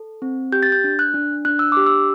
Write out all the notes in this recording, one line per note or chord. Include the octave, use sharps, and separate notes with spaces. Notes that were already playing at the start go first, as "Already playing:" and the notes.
Already playing: A4
C4
G4 G6
A6
G6
D4
F#6
D4
D4 F#6
E6
G4 D6
E6